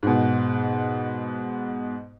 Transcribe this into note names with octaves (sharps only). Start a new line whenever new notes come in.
G#2 B2